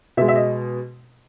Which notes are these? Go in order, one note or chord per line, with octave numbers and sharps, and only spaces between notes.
B2 G#3 E5
E5
D#5